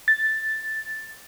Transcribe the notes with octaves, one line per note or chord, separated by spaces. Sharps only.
A6